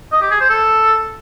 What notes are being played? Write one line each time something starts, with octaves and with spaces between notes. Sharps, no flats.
D#5
G4
G#4
C5
A4